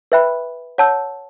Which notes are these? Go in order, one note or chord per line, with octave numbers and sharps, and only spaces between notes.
B4 E5 G5 B5 F#6
C#5 F#5 A5 E6 G6